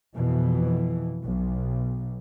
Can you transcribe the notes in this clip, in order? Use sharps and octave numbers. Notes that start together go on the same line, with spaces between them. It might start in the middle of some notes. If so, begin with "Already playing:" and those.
F2 B2 E3
B1